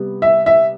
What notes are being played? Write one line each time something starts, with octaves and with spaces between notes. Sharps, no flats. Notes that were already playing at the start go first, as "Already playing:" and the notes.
Already playing: C3 G3 B3
E5
E5